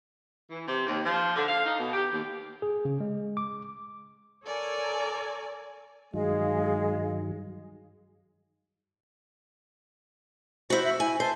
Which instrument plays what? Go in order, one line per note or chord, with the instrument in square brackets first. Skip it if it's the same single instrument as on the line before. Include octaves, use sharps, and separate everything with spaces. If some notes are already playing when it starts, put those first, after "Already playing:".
[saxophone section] E3
C3
D#2
F3
D3
F5
D#4
B2
G4
D#2
[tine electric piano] G#4
C#3
G#3
D6
[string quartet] A4 A#4 C#5 D5 G#5
[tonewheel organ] G2 D#3 F#3 [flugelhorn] G#3 [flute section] G#4 D#5 F5
[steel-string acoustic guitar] E4 F#4 [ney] C5
[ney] E5
[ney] E4 [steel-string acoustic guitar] G#5
[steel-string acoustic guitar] C5 [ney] A5